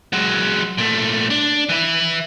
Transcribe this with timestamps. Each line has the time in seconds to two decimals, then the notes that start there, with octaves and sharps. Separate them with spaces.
0.13 F#3 G#3
0.78 A#2 A3
1.30 D4
1.69 E3 E4